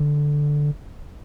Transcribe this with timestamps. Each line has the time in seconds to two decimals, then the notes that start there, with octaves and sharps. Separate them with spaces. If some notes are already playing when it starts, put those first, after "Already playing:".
Already playing: D3